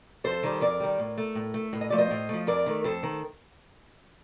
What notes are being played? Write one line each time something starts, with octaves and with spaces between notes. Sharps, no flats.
F2 A4 C5
D#3 G3
F2 A#4 D5
D#3 G3
A2
A3
A2
A3
A2
D#5
F3 A3 D5
C5 D#5
A2
F3 A3
F2 A#4 D5
D#3 A3
F2 A4 C5
D#3